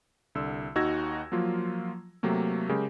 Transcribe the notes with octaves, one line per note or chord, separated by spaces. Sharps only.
C2 D3 E6
D#2 D#4 F#4 E6 G#6 A#6
F3 F#3 A#3 F4
C3 F#3 A3 A#3
C#3 G#3 G4 A#4